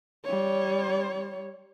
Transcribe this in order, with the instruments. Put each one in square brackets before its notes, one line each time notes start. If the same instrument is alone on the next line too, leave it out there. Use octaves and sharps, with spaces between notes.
[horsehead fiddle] G3 C#5